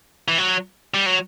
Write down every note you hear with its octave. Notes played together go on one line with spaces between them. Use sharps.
E3
F#3
G3
F#3